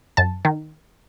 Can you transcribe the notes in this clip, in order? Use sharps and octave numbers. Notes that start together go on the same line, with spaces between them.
F#2 A5
D#3